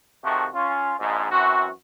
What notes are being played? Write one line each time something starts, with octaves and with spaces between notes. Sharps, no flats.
C3 D#3 F3 A3 F#4
C#4 F4
A#1 G#2
F#2 E3 C4 F#4